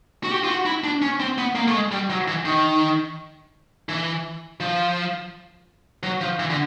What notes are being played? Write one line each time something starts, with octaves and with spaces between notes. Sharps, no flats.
F#4
G4
F4
F#4
E4
D4
C#4
C4
B3
A#3
A3
G#3
G3
F#3
E3
D#3
E3
F3
F#3
F3
E3
D3